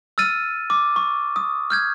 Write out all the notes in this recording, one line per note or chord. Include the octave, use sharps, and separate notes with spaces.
E6 F6 A6 D#7
D6
C#6
D#6
F6 G6 G#6